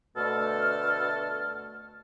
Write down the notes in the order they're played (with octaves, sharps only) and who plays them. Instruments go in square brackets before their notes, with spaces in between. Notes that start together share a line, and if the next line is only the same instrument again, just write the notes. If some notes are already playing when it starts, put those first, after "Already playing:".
[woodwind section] D2 B2 D3 A3 A4 F6